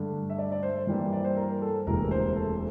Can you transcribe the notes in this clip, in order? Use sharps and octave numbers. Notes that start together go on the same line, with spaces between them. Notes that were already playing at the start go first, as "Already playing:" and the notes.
Already playing: G2 D3 A3
E5
D5
D5
C5
G2 E3 G3 A#3 E4
D5
C5
A#4
A4
E1 D2 C3 E3 A#3 A#4
C5
A4